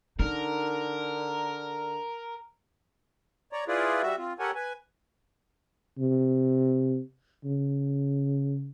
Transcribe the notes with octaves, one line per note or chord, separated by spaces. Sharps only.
D3 D#4 A#4
C#5 D5 A#5
E4 F4 G#4 B4 D5
G3 F#4 E5
C4 F4
G4 A4 A#4 C#5 F#5 G#5
B4 G#5
C3
C#3